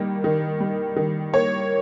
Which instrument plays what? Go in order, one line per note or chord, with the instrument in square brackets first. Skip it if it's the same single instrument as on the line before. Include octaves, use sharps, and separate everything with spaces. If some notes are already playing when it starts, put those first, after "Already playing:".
Already playing: [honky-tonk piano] D#3 G3 A#3
D#3
G3
D#3
A#3 C#5